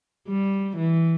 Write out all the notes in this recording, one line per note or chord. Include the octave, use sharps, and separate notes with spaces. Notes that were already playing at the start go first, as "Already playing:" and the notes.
G3
E3